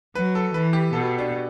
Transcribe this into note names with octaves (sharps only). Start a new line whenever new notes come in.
F#3 B4
A4
E3 B4
G4
B2 A4
D4